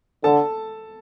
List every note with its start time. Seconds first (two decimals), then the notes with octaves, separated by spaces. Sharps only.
0.24 D3 A4 A5